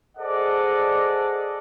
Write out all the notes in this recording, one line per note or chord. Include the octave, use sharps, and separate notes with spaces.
G#4 A4 C5 D5 D#5 F#5